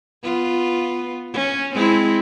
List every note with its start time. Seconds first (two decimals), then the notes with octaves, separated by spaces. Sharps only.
0.24 B3 F4
1.33 C#4
1.74 G#3 C4 E4